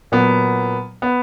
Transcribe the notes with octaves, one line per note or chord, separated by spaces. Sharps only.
A#2 F#3 B3
B3